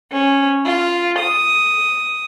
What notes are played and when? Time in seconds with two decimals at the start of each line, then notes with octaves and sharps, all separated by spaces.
0.12 C#4
0.65 F4
1.18 D#6